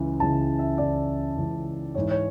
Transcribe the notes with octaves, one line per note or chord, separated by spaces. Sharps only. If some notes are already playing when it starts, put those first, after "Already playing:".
Already playing: C#2 C#3 E3
C#2 C#3 E3 A5
E5
C#2 C#3 E3 D5
C#2 C#3 E3
G#2 E3 C#5
C#5